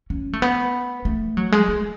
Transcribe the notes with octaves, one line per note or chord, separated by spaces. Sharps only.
C#4
A3
B3
A3
F#3
G#3
G#3